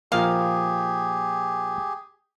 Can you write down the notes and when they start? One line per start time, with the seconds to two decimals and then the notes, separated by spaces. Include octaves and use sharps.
0.12 A#2 F3 A#3 G4 G#4 F5